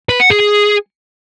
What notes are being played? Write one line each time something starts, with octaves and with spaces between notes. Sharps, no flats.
B4
F#5
G#4